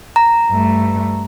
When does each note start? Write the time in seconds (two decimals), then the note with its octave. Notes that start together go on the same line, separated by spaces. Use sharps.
0.16 A#5
0.49 G2 A3